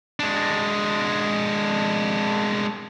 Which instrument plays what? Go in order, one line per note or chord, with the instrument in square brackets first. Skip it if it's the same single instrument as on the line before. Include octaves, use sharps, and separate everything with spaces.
[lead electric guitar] G#3 D4